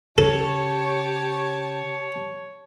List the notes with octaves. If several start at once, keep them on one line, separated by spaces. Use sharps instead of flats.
C#3 G4 A4 C#5 A5